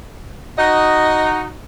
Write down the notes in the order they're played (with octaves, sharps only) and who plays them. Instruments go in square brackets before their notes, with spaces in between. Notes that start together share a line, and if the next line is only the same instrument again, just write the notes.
[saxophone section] D#4 F#4 D#5